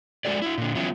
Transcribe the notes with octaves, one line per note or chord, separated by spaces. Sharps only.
G#3 B3 F#4 A4 D5
E4 F#4
A#2 D3
E3 F#3 B3 C#4 E4 F4